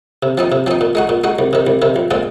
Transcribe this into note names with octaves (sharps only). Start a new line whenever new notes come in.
C3
F3 C4 D#4
C3
F3 C4 D#4
A#2
G#3 D#4 F#4
A#2
G#3 D#4 F#4
C2
C3 D#3
C2
C3 D#3
A#1
A#2 G#3 C4 F4